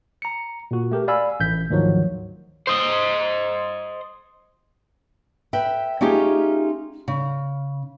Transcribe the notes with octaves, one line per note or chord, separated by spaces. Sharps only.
A#5 C#7
A#2 F#4
A3 G4 A#4
D5 F5 G#5 B5 E6
A1 G6 B6
D2 G#2 D#3 F3 F#3
C5 D#5
B4 E5 G5
A3 C#4 D#4 F4 G4 G#4
C#3